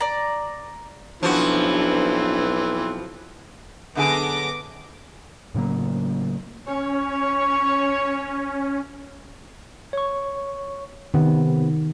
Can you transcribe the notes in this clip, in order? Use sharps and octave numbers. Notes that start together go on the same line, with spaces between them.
D5 A#5
B1 E3 F3 C4 D4 F#4
F#2 D3 B3 G#4 D6 A#6
A2 C#3 F#3 A#3
C#4 C#5
C#5 C#6
C3 D#3 B3